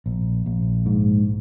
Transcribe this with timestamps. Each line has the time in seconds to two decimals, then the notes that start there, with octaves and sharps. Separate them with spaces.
0.06 A#1
0.46 A#1
0.86 G#2